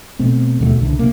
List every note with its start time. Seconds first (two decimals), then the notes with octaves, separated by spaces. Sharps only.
0.19 B2 A3 C4
0.60 D#2 B2 G3 A3
0.79 C2 D3
0.99 C3 A#3